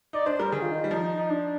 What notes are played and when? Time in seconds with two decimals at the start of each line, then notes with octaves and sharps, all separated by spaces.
0.13 D#4 D5
0.26 D4 C5
0.39 G3 A#4
0.52 D#3 G#4
0.62 F4
0.71 D#4
0.84 G3
0.91 F3 D#4
1.04 D#4
1.17 D#4
1.30 D4